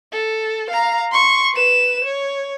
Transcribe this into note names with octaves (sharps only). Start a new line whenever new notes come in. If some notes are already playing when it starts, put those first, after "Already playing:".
A4
F5 A#5
C6 C#6
B4 E7
C#5